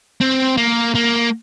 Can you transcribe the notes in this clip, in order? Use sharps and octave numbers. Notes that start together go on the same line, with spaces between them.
C4
A#3
A#3